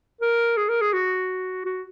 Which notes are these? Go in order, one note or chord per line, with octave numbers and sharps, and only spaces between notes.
A#4
G#4
A#4
G#4
F#4
F#4